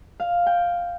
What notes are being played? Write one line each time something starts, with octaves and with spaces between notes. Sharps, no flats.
F5
G5